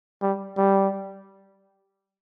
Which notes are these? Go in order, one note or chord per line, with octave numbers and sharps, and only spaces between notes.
G3
G3